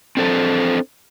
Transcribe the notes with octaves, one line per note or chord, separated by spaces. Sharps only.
C4 D4 A4 C5